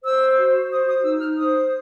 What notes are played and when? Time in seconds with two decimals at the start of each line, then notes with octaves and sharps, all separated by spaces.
0.04 C5 E6
0.38 F#4
0.72 C5 D#6
0.88 D#6
1.04 D#4 E6
1.22 F6
1.37 C5 D#6